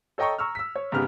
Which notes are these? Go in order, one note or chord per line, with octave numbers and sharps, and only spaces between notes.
A4 C#5 D#5 G5 A#5 C#6
A#5 C#6 E6 F6
E6 B6
C#5
G#2 C#3 G#3 B3 G4 F6